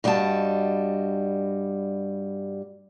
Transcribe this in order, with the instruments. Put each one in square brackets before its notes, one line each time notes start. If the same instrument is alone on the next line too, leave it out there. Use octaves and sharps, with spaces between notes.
[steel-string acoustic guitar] G2 G3 F#4 D#5 A5